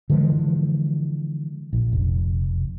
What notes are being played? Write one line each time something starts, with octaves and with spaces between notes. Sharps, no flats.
D3 E3 F3 G#3
A#1
F1